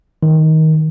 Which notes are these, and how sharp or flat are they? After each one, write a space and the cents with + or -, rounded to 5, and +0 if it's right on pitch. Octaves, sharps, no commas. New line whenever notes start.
D#3 +20